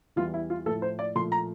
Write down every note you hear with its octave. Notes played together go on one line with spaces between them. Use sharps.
E2 E3 G3 F4
E4
F4
A2 F3 A3 A4
C5
D5
A#2 F3 A3 C6
A#5